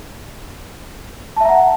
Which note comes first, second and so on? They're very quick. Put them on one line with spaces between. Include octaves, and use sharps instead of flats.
A5 E5 A#5 F#5